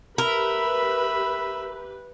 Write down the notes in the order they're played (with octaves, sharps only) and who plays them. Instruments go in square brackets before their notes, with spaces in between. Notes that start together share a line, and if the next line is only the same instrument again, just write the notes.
[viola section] G4 B4 [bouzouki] A#4 [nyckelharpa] E5 B5